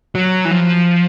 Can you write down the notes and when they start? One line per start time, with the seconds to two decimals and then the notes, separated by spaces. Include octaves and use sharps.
0.15 F#3
0.45 E3
0.51 F3